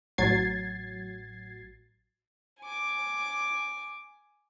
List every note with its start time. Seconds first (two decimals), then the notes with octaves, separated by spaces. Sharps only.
0.18 A1 F#3 G#6 A6 C7
2.61 G#5 D6